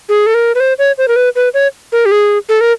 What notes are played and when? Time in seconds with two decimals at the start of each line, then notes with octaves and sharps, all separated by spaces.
0.09 G#4
0.26 A4
0.34 A#4
0.55 B4
0.60 C5
0.79 C#5
0.98 C5
1.08 A#4
1.16 B4
1.36 B4
1.54 C#5
1.92 A#4
2.06 G4
2.11 G#4
2.49 A4
2.61 A#4